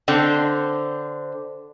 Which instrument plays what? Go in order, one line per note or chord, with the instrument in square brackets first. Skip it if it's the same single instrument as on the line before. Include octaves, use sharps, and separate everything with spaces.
[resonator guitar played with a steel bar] D3 C4